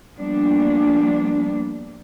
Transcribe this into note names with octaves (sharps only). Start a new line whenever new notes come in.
F3 G3 A#3 B3 D4